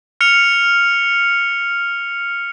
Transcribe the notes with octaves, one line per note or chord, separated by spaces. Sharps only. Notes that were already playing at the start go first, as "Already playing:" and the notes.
F6 C#7 F7